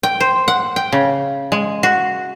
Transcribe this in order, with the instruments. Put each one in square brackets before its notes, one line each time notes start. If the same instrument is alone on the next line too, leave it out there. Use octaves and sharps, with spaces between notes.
[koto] G5
C5
F#5
G5
C#3
G#3
F#4